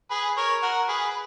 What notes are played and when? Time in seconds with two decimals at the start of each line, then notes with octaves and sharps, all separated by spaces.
0.10 G#4 B4
0.37 A#4 C#5
0.62 F#4 A#4
0.88 G#4 B4
1.10 B4